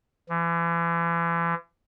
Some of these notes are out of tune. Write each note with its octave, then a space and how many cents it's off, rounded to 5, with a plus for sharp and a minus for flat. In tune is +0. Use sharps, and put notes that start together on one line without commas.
E3 +40